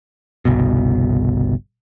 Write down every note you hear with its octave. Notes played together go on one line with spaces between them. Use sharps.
G1 C2 B2